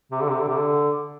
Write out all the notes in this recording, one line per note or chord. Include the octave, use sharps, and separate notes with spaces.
C3
D3
C3
D3
C3
D3